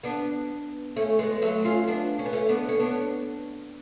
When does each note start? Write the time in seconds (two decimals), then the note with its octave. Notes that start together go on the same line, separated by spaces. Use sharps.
0.03 B3 D4
0.96 A3 C#4
1.19 G#3 B3
1.42 F#3 A3
1.65 C#4 F4
1.88 B3 D4
2.19 C#4
2.26 B3
2.33 A3 C#4
2.49 B3 D4
2.69 C#4
2.79 B3 D4